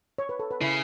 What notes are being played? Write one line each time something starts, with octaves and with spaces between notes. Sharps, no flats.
C#5
B4
A4
B4
C#3 E4